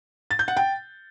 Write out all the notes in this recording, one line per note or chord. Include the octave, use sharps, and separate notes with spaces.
A6
G6
F#5
G5